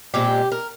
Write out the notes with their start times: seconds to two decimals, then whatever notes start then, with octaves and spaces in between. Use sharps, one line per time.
0.14 A#2 G#3 C4 G4
0.52 A#4